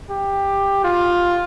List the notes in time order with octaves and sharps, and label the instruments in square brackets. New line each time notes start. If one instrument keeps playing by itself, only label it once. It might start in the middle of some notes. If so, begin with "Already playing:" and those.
[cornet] G4
F4